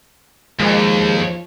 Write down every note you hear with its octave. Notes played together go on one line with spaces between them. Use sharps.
D#2 F3 G#3